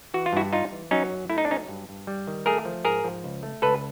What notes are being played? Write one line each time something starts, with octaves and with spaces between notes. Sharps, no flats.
E3 F#4
F4
G2 E4 F#4
G3 D#4 F4
E3
F#3 C#4 D#4
F#2
A3 E4
D#4
D4
F#3 C#4 D#4
G2
G2
G3
D#3
A3 G#4 A#4
F3
G#2 G#4 A#4
F3
C#2
A3
C#2 A4 B4